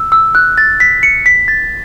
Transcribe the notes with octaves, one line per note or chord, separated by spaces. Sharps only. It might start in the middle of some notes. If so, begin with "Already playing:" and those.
Already playing: E6
E6
F#6
A6
B6
C#7
B6
A6